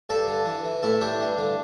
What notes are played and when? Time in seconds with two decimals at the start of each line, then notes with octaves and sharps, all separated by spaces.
0.09 G2 A4 D5
0.27 D3
0.46 E3
0.64 E3
0.83 A2 E4 A4
1.01 E3 D4 G4
1.20 G2
1.38 D3